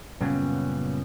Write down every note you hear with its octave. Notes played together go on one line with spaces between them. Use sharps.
F#2 A#2 C#3 G3 B3 C#4